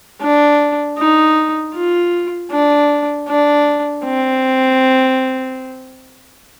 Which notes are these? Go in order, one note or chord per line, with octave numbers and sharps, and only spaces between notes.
D4
D#4
F4
D4
D4
C4